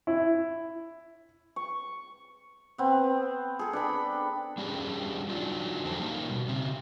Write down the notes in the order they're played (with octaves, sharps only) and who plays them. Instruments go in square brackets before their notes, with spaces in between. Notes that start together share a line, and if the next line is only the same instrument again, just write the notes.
[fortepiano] E4
[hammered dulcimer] C#6
B3 C4
G#4 A4
D4 G5 B5
[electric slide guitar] G3 C#4 D4 G4 G#4
F#3 D4 D#4 F4
F2 D3 F#3 A4 C5 A5
G3 A#3 D#4 G4
B2
C#3 C4